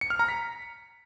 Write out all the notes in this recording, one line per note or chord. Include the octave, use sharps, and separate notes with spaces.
C#7
F6
A#5
B6